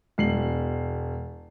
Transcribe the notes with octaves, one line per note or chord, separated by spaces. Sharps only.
E1 C7 F#7